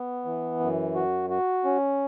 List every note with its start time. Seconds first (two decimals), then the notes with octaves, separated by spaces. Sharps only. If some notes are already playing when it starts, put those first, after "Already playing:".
Already playing: B3
0.25 E3
0.60 F#2
0.95 F#4
1.30 F#4
1.65 C#4